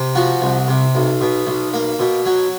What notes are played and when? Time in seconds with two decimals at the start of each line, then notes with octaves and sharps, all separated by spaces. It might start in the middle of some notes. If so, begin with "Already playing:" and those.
Already playing: C3
0.15 F3 F#4
0.42 C2
0.68 C3
0.95 B1
1.21 B2
1.47 B1
1.74 A#3
1.99 B2
2.26 F#3